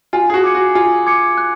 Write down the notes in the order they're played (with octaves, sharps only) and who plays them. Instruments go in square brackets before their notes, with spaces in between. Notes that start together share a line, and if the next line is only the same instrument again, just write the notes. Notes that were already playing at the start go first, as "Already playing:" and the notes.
[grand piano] F4 [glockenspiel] G#5
[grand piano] G#4
F#4
[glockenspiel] D6 G#6 C#7
[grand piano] F#4
[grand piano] F4 [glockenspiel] G#5
[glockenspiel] D6 G#6 C#7
F#6